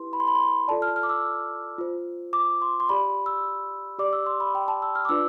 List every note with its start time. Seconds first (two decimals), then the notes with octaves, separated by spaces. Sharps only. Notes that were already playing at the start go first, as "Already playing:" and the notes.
Already playing: E4 G4 B4 C6
0.13 B5
0.20 C6
0.27 B5
0.35 C6
0.42 B5
0.68 F4 A4 D5 A5
0.82 F6
0.96 F6
1.03 D6
1.09 E6
1.78 F4 C5
2.33 D6
2.62 C6
2.80 C6
2.89 G4 D5 B5
3.26 E6
3.99 G4 D5 D6
4.13 E6
4.26 C6
4.40 B5
4.55 G5
4.68 A5
4.82 E6
4.95 F6
5.05 D6
5.09 D4 F4 B4 D5 E6